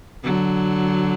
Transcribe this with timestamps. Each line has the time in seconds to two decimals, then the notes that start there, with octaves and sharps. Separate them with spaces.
0.24 D3 F#3